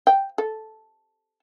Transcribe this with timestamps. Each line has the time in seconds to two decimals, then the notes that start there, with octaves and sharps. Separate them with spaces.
0.07 G5
0.38 A4